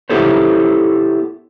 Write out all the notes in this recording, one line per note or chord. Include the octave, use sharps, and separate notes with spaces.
B3 E4 G4 A4 C5 C#5